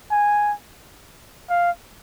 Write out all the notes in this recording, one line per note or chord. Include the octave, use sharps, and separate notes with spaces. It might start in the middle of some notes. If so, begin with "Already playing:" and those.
G#5
F5